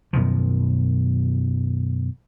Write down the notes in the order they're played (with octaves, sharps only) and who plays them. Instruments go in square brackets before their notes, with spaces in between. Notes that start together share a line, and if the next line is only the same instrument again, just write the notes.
[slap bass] F#2 B2 D#3 F3